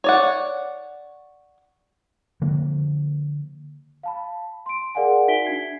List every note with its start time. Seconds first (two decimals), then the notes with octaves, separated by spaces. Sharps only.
0.04 C#5 D5 F#5
2.42 D3 F3 A#3
4.03 F5 A5 B5
4.66 C6 D7
4.95 G#4 A#4 D5 F5 F#5 G#5
5.28 D#4 F#4 E5 B6 D7 G7
5.44 D4 G#6 C7